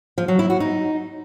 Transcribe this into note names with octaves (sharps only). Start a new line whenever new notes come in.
F3
F#3
E4
F#4
D#4